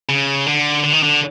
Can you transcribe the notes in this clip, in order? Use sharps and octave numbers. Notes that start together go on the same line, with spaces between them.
C#3
D3
D3
D#3
D3